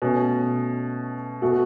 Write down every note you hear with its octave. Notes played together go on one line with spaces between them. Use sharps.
B2 A3 C#4
B2 A3 F#4